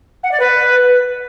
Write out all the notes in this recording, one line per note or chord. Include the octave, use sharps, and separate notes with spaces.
F#5
D5
B4